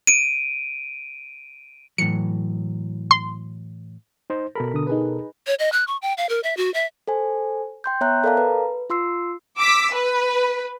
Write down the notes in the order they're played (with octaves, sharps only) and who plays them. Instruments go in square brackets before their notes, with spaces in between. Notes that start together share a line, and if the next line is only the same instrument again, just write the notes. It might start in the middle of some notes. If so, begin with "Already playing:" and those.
[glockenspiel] D7 D#7
[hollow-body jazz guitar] A2 E3 F#3 [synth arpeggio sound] C#7
[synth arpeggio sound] C6
[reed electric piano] D#4 C5
[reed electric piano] B2 A4 A#4 [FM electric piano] B5
[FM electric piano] D3 D#6
D#4 G#4 B4
[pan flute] C#5
D#5
F#6
C#6
G5
F5
A#4
E5
F#4
E5
[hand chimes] A4 C5 G#5
G5 C6 G6
B3 C#5 E5 G5 A#5 F#6
A4 A#4 D5 F5 A5 A#5
B4
F4 C6 E6 C7
[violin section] D6 E6 B6
B4